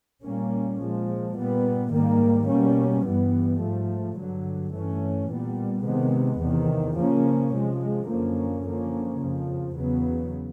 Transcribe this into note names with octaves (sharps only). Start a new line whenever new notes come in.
A#2 G3 A#3 C#4
A#2 F3 G#3
A#2 G3 B3
G#2 D#3 G3 A#3
B2 G3 A#3 C#4
G2 E3 G3 B3
G#2 F3 A3
G2 D3 F#3
G2 E3 A3 C#4
A#2 G3 B3
C3 D#3 G#3 B3
E2 C3 D#3
C#3 F3 A#3 C#4
C3 F3 G#3
F#2 D3 F3 A#3 C#4
D3 F3 A#3 C#4
F2 C#3 F3
E2 C#3 F#3 B3